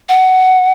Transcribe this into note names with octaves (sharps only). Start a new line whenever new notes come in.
F#5